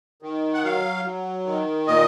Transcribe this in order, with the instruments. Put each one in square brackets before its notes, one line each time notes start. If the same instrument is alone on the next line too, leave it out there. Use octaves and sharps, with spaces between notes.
[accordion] D#3
F#5
F#3 F5
F#3
D#3
A#2 D#5